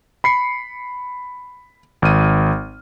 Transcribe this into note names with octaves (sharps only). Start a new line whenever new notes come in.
B5 C7 C#7
G#1 F6 D#7